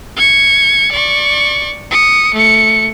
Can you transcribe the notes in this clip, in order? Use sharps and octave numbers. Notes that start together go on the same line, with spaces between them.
G#6 C#7
D5 C#6
D#6 C#7
A3 C#7